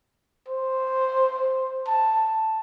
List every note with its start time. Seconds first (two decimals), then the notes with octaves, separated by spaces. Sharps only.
0.49 C5
1.87 A5